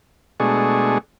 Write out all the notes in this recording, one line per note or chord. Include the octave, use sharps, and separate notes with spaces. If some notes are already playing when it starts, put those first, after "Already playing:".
B2 G#3 A3 D4 G#4 C#6